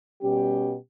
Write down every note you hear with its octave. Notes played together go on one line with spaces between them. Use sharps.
B2 G3 C#4 G4